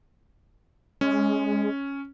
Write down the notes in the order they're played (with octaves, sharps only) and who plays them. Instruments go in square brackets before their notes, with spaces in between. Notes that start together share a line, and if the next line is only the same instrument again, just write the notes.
[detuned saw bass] G#3 [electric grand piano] C#4